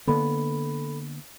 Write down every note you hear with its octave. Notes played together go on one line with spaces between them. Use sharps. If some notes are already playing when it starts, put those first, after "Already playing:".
D3 A#3 B3 A4 B5